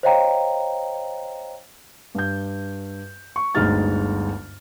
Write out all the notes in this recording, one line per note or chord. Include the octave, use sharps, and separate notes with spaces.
C5 C#5 D#5 F5 G5 A#5
G2 G6
C#6
G1 D2 G#3 D#4 F6 A6